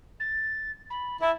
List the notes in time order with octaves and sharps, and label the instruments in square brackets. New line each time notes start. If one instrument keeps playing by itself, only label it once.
[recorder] A6
B5
[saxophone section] E4 [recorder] A5